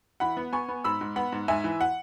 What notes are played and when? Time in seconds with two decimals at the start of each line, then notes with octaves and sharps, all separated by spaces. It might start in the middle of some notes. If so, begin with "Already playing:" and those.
0.20 E3 F#5 B5
0.37 B3
0.53 B3 G#5 C#6
0.69 B3
0.84 G#2 B5 E6
1.01 G#2
1.16 B3 F#5 B5
1.32 G#2
1.48 G#2 E5 G#5
1.64 E3
1.81 F#5